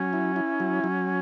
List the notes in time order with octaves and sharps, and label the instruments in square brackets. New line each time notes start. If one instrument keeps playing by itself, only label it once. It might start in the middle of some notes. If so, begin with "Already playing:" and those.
Already playing: [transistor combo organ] F#3 [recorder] C#4
[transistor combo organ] E4
E4
F#3
F#3